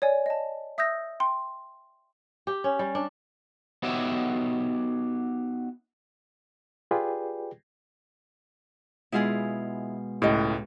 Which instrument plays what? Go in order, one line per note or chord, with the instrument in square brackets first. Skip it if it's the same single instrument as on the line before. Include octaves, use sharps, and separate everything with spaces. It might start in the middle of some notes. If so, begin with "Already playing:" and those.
[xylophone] C#5 D5 G#5
D#5 A5
E5 D#6 E6 G6 A#6
G5 C6
[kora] G4
C#4
G3
D4
[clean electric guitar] B3 D#4 F#4 G4 C#5 E5
[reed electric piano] F4 G4 G#4 B4 D5 G5
[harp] B2 G#3 F5 [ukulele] E4 F4 G#4
[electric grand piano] C#2 A2 [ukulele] G4 D#5